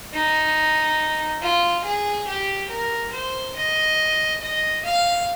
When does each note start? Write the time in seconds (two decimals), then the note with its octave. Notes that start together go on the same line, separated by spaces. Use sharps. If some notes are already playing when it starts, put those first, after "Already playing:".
0.14 D#4
1.42 F4
1.85 G#4
2.27 G4
2.70 A#4
3.13 C5
3.56 D#5
4.42 D#5
4.85 F5